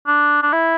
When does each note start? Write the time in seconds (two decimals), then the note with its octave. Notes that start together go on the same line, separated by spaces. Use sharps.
0.07 D4
0.43 D4
0.53 E4